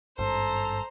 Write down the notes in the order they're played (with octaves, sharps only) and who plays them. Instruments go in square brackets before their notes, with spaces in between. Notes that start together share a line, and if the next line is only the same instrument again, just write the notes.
[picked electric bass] G#1 G2 [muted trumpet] A4 [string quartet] C5 A#5